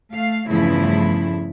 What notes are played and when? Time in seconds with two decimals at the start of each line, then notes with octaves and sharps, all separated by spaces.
0.12 A3 F5
0.48 E2 G2 C#3 F3 A3 E4